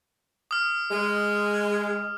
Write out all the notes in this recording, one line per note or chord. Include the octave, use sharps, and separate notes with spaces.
D#6 F6
G#3